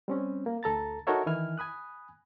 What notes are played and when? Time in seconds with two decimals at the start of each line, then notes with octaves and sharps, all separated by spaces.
0.08 G3 C4 C#4
0.46 A#3
0.63 D2 A4 A#5 A6
1.07 D#4 F#4 A4 A#4 C#5 E5
1.26 D#3 E3 E4 G#5 F6
1.58 G#5 B5 D#6 F#6